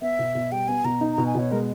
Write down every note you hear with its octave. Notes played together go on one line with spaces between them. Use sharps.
B3 E5
B2
B2
G3 G5
B3 G#5
B2 A#5
D#4
B2 A#5
G#5
B2 C#5
G#3 A#4